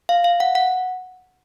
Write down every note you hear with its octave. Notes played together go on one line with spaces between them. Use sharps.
F5
F5
F#5
F#5